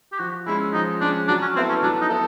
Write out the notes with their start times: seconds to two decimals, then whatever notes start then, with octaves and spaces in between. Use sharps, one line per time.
0.12 G4
0.18 F3 F#4
0.46 G#3 C#4 E4
0.73 F3 D#4
1.00 G#3 C#4 D4
1.28 F#3 D4
1.42 C#4
1.56 B3 C4 E4 A4
1.69 C#4
1.83 F#3 D4
2.01 D#4
2.10 B3 E4 A4